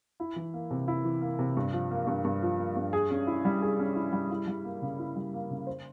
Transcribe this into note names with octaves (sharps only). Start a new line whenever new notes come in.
E4
E3
A#3
C3
E4
E3
A#3
C3
G2
F3
A#3
G2
G2
F3
A#3
G2
G#4
C#4
E4
G3
G#4
C#4
E4
G3
E4
G3
A#3
C#3
E4
G3
A#3
C#3
C5